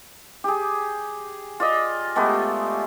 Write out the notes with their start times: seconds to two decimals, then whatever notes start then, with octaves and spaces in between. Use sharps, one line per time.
0.44 G4 G#4
1.60 F4 D5 D#5
2.16 G#3 A3 B3 G4